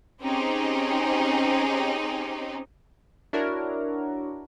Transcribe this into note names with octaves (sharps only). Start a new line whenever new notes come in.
C4 C#4 D#4 G4 G#4
D4 E4 F#4 A#4 C#5